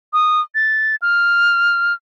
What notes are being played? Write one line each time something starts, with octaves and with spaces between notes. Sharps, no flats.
D#6
A6
F6